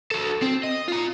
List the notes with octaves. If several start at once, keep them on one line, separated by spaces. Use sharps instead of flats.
F#4 A4
C4
D#5
F4 A#5